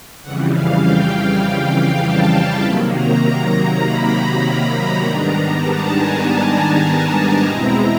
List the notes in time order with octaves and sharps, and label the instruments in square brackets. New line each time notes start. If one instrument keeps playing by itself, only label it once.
[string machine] F2 C#3 E3 G3 F#5
F5
G5
A5
C3 D#3 F#3 A#3 B5
A#5
A#5
B5
G#2 D#3 G3 B3 D4 A#5
A5
G#5
A5
A#5
E2 B2 G#3 C4 E4 A#5